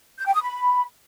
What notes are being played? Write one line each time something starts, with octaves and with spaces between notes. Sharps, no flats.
G6
G5
D#6
B5